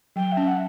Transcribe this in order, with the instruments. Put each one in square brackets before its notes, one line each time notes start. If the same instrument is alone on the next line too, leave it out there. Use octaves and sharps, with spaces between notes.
[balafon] F#3 [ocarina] G5
[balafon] C#4 [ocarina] E5
[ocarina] F#5